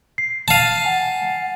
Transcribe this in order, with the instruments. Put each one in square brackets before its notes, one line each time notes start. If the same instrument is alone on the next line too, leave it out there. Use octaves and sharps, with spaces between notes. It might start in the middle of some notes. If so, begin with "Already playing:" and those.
[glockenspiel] C7
[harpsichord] F5 A5 [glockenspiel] A6 D#7
[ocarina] F#5 [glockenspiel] G#5